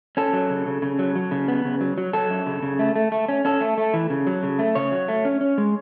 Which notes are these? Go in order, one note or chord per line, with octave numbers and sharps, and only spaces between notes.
C#4 A4
F#3
C#3
C#3
C#3
F#3
F#3
C#3
B3
C#3
F#3
F#3
F#3 A4
F#2
C#3
C#3
A3
A3
A3
C#4
C#4 A4
A3
A3
E3
C#3
F#3
C#3
A3
C#3 C#5
F#3
A3
C#4
C#4
G#3